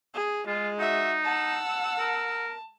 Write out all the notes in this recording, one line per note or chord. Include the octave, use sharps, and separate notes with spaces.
G#4
G#3 F4
D#4 F#4 E5
F#5 A5 E6
A#4